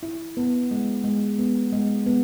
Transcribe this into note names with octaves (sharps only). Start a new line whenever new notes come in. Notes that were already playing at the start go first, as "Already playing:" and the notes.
E4
B3
G#3
G#3
B3
G#3
B3